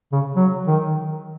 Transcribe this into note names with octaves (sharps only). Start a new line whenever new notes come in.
C#3
F#3
D#3